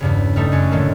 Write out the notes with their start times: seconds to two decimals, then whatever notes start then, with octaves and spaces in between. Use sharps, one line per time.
0.01 E2 G2 C#3
0.36 G3 A3 D#4 A4
0.52 F#2 C#4
0.71 A2 D3 D#3 F#3 A3 A#3